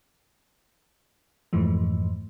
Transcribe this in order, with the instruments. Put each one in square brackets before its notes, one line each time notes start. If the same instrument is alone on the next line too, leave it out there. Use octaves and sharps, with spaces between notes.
[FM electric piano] F2 G#2 E3 F3 A3